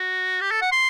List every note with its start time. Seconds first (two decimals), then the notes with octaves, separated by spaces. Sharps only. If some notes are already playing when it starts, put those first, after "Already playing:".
Already playing: F#4
0.41 G4
0.51 A4
0.62 F#5
0.72 C6